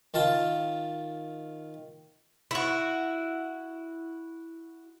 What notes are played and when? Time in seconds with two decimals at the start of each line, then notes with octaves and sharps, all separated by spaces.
0.14 D#3 F4 A5
2.51 E4 F#4